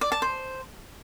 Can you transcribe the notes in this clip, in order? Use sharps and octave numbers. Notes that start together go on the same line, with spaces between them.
D5
A5
C5